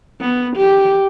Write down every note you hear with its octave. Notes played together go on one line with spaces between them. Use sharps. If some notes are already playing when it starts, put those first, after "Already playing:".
B3
G4